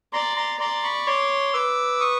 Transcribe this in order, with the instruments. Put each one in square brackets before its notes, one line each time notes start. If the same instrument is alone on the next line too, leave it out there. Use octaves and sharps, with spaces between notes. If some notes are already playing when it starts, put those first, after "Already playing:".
[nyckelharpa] D5 [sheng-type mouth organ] A#5 C6
[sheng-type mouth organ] A#5 C6
[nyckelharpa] D5 [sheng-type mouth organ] A#5 C6
[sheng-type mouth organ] B5 C#6
[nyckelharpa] C#5 [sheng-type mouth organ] C6 D6
[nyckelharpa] B4 [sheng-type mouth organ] D6 E6
[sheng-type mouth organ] C#6 D#6